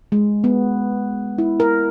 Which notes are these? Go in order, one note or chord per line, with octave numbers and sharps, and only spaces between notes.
G#3
B3
E4
A#4